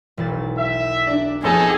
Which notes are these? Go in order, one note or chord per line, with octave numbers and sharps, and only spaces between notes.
E1 B1 A6
E5
D4
F2 B3 D#4 G#4 A4 C#5